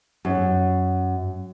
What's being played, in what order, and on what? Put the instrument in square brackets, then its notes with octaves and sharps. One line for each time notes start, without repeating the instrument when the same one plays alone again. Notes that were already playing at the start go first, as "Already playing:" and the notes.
[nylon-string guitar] F#2